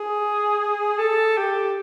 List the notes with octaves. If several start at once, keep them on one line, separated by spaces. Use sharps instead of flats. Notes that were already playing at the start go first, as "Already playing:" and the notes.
Already playing: G#4
A4
G4